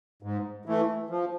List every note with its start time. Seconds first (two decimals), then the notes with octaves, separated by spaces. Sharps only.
0.22 G#2
0.66 E3 A3
1.10 F3